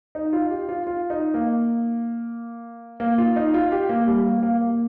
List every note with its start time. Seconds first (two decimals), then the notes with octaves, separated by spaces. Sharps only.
0.15 D#4
0.33 F4
0.50 G4
0.69 F4
0.87 F4
1.10 D#4
1.34 A#3
3.00 A#3
3.18 F4
3.36 D#4
3.54 F4
3.72 G4
3.89 A#3
4.07 G3
4.25 A#3
4.43 A#3
4.61 A#3